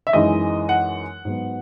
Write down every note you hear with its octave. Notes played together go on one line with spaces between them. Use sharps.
E5
F#2 E3 G#3 D#4 D#5
F#5
G#2 F#3 B3